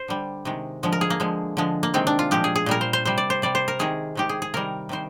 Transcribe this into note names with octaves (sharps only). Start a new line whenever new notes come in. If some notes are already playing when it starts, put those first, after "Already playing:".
Already playing: C5
D3 G3
C3 D#3 G#3
D3 F3 G#3
A#4
G#4
A#3
D3 F3 G#3
D3 F3 G#3
A#3
C3 D#3 G#3 C4
D4
F4
A#2 F3 G#3 G4
G#4
G#4
A#2 G3 A#4
C5
C5
C3 G3 C5
D5
C5
C3 G3 D5
C5
A#4
C3 D#3 G#3 G#4
C3 D#3 G#3 G4
G#4
G#4
C3 D#3 G3 A#4
C3 D#3 G3 C5